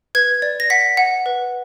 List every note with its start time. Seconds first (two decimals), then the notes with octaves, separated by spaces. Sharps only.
0.15 B4 G#6
0.42 D5
0.60 A#6
0.70 F#5 B6
0.97 F#5
1.26 B4